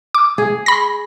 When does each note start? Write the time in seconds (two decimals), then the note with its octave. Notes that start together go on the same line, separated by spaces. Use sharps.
0.15 D6
0.38 G#4
0.66 B5 A#6